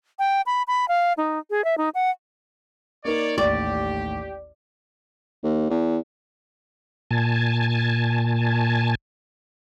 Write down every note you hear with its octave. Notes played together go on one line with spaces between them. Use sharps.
G5
B5
B5
F5
D#4
G#4
E5
D#4
F#5
A#3 D#4 A#4 C#5 D5
A1 D#2 G4 D5 C#6
D#2
E2
A#2 G#5 A5